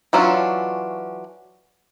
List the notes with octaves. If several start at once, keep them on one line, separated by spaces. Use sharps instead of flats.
E3 F#3 C#4 D4 F4